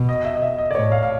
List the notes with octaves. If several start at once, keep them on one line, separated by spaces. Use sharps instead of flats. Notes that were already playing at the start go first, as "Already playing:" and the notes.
Already playing: B2
D#5
E5
D#5
E5
D#5
D5
A2 C#5
F5
F5